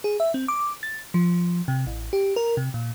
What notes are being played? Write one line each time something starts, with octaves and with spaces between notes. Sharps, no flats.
G#4
E5
C4
D6
A6
F3
C3
A1
G4
A#4
C3
A#2